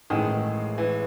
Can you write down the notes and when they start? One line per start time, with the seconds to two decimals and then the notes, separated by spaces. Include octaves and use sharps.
0.10 A1 A2 D#3 G#3 D#4 G#4
0.78 E3